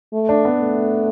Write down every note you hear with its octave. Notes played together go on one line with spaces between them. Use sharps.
A3
D4
B3
A3